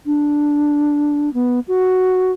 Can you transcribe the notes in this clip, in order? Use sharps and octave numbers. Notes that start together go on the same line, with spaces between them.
D4
B3
F#4